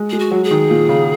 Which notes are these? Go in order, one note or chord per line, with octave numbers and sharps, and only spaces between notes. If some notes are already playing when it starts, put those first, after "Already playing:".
Already playing: G#3
G#3 G#4
F#4
F#3
G#4
D#3
A#2
C#3